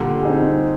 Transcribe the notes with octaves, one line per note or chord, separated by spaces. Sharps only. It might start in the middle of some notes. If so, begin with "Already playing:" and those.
Already playing: A#2 D3 G3
C4 D#4 G#4